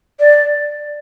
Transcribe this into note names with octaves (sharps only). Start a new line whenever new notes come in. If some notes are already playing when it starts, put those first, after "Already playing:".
D5